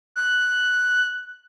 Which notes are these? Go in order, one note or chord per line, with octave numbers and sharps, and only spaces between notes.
F#6